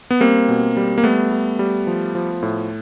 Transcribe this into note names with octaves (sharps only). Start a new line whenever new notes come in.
B3
G3 A#3 C4
B2
G3
A#3
G3 A3 B3
G3
G3
F3
F3
A2